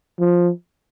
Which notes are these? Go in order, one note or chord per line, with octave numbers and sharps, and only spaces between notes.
F3